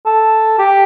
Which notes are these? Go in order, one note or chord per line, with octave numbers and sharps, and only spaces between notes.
A4
G4